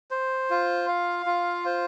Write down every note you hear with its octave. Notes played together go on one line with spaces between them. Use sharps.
C5
F4
F5
F4
C5